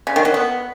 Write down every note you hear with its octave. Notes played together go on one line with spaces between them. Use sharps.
C#3
D#3
F#3
B3